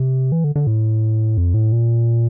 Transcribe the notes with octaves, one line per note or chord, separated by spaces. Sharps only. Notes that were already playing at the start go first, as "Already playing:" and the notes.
Already playing: C3
E3
D3
D3
A2
F2
A2
A#2